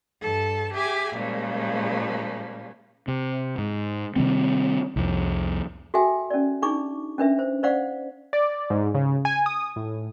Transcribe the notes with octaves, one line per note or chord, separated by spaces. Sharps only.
G2 A4 A5
G4 G#4 E5 G#5 D6
A#2 C#3 F3 G3 G#3
C3
G#2
C3 D#3 G3 C4
C2 F2
F#4 G#4 A4 E5 G5 G#5
C#4 D5
D4 D#4 G#4 C#6 D6
C#4 D4 B4 E5
C5
C5 D5 F5 F#5
D5
G#2
C#3
G#5
D#6
A2